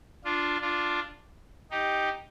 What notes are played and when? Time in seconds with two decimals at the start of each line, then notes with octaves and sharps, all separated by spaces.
0.24 D4 F4
0.61 D4 F4
1.71 D#4 G4